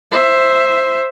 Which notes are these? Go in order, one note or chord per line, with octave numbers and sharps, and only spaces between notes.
C5 E5